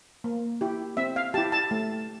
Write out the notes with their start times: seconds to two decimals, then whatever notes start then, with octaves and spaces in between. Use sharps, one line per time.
0.24 A#3
0.61 E4 G4
0.97 C4 E5
1.16 F5
1.34 E4 G4 A5
1.52 A5
1.71 A3